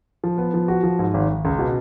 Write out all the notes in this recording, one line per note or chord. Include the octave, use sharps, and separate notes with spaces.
F3
B3
F3
F#4
F3
G#2
G#1
G#1
C#2
B2